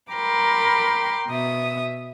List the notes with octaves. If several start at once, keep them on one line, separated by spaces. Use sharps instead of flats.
A#4 G5 B5 C6 D6
B2 E5 D#6